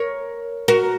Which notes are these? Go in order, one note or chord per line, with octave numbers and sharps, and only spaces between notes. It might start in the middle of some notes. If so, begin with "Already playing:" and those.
Already playing: A#4 C#5
F#4 A#4